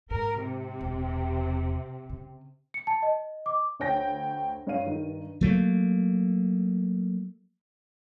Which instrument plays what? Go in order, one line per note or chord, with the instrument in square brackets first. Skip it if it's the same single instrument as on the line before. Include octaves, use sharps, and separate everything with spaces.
[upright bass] G#2 [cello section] A#4
[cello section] C3
[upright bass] E1
C#3
[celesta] C#7
A5
D#5
D6
[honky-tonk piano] D2 C#5 G5 A#6
G2 C#5 F5 D#7
G2 D#3
[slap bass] F#3 A3 A#3